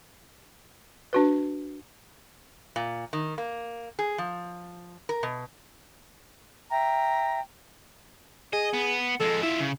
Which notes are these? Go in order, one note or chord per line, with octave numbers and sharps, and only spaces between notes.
D4 F#4 B4
A#2
D#3
A#3
G#4
F3
A#4
B2
E5 G5 A#5
G#4 D#5
B3
F2 G#3 A4
E4 F4 E5
C#3